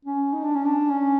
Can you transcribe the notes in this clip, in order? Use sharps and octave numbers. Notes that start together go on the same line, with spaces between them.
C#4
D#4
D4
C#4
D4
C#4